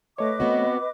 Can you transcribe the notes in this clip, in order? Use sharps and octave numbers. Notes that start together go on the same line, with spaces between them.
A3 B4 C#5 D#5 D6
B3 C4 F#4